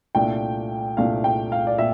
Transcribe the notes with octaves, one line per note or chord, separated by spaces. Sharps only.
C2 A#2 A3 D4 G5
C2 A#2 A3 D4 F5
G5
F5
D5
A#2 E5